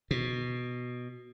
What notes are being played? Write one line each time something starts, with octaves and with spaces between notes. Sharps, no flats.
B2